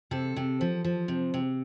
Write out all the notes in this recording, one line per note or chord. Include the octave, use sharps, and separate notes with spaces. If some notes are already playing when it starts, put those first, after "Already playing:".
C3 A4
C3
F3
F3
C3
C3